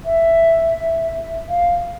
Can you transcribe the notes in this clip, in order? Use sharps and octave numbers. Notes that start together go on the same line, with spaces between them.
E5
F5